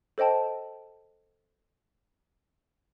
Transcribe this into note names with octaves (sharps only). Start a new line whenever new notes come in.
A4 C5 D#5 G5 A5